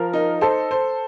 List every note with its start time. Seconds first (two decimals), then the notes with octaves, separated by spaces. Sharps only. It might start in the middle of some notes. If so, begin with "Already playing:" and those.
Already playing: F3 A#4
0.13 D#4
0.41 A4 C5
0.71 C5